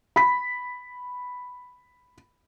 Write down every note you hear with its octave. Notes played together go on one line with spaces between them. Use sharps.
B5 B6